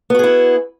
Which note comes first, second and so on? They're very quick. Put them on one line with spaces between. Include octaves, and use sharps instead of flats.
B3 F#4 G#4 E4